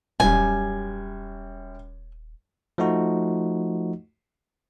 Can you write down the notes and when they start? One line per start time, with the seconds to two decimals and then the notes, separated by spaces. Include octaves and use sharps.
0.20 D#1 F#2 G3 G#5
2.78 F3 A3 D#4 F#4